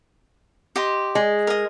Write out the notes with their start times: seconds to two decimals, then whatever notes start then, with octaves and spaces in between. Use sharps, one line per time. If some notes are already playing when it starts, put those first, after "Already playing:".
0.76 G4 D#5 C6
1.15 G#3
1.47 A#4 D#5